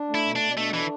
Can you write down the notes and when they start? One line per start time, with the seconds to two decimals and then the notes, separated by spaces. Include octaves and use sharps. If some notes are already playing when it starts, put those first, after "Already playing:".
Already playing: D4
0.09 A3
0.15 E4
0.25 B2
0.36 D4
0.42 B2
0.57 A3 D4
0.73 E3 A3